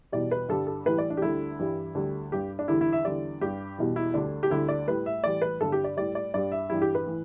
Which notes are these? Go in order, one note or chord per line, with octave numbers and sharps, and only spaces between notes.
E2 B2 G3 D5
B4
G2 D3 G3 A4
A4
A2 E3 G3 B4
D5
D4
G4
D2 D3 G3 E4
G2 E3 G3
D2 D3 G3
G2 G3 G4
D4
E2 D3 G3 E4
E4
E5
E2 D3 G3 D5
G2 G3 G4
E2 B2 G3
E4
D2 D3 G3 D4
G4
D2 D3 G3 E4
D5
A2 G3 B4
E5
A2 E3 G3 D5
B4
G2 D3 G3 A4
G4
D5
A2 G3 D5
D5
G2 G3 D5
E5
G2 E3 G3 E4
G4
B4
A2 E3